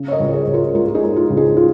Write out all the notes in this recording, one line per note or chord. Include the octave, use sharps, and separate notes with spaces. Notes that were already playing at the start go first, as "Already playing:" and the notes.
Already playing: C#3
C#5
A#4 D#5
C#2
G#4 C#5
C#2
F4 A#4
G#3 F4 A#4
A#4
D#4 G#4
G#3
F4
C#2
D#4 G#4
F4